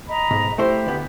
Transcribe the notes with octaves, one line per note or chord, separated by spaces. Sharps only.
D#5 A#5 B5
B1 G#2
A3 E4 G4 C5
D2 B3